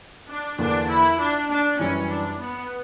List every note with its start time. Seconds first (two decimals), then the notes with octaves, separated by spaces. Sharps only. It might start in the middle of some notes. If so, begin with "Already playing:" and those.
0.28 D4
0.59 E2 D3 A#3 D4
0.88 E4
1.18 D4
1.49 D4
1.79 F#2 E3 G3 C#4
2.09 D4
2.39 B3